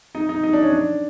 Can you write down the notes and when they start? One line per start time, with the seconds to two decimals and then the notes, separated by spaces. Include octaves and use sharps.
0.15 D#4
0.29 D#4
0.43 D#4
0.53 D4
0.63 C#4
0.73 D4